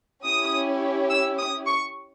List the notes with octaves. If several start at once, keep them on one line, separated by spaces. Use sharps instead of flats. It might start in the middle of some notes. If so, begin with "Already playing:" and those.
C#4 E4 G4 D#6
E6
D#6
C#6